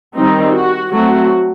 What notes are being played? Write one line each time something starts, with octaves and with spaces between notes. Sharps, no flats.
D#3 G3 C4 D#4
F#4
F#3 A3 C4 F#4